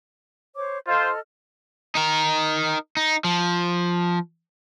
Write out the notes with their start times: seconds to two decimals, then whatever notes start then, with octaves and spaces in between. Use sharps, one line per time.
0.55 C5 C#5 D6
0.87 F4 A4 C5 D#5 F6
1.95 D#4 A#4
2.97 D#4
3.24 F3